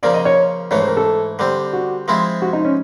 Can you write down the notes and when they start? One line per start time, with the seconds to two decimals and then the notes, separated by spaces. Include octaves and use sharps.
0.03 C#3 F3 A#3 D5
0.14 D#5
0.25 C#5
0.71 G#2 E3 A3 C#5
0.80 C5
0.88 A#4
0.97 A4
1.39 D3 G3 C4
1.73 F#4
2.08 F3 G#3 C4 E4
2.42 F#4
2.53 D#4
2.65 C#4